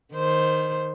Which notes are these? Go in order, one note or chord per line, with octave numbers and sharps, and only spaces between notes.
D#3 C5